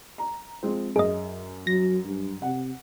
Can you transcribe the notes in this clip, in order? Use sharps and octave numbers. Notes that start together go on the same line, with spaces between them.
A#5
F3 G#3 C4
F#2 G#4 D#5
F#3 A#6
G2
C3 F#5